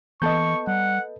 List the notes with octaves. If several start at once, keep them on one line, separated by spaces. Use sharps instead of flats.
E3 B3 A4 D#5 C#6 G6
G3 F#5